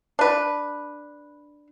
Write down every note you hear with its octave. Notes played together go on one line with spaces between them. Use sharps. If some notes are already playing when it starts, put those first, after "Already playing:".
D4 B4